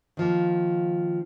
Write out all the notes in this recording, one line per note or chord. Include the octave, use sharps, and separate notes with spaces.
D#3 F3 A#3